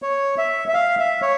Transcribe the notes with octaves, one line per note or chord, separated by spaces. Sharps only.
C#5
E5
E5
F5
E5
C#5